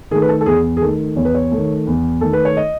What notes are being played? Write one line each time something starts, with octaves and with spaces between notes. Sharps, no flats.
D#3 A3 G#4
B4
A4
A4
E2 G#4
G#4
D#3 A3 A4
E2 C#5
B4
C#5
D#3 A3
E2
D#3 A3 A4
B4
C#5
D#5